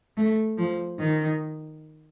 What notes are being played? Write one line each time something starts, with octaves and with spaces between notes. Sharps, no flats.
A3
F3
D#3